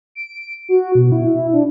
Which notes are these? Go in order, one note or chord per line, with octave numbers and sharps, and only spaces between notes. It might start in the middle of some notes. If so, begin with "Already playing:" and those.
D7
F#4
B2
E4
E4
D4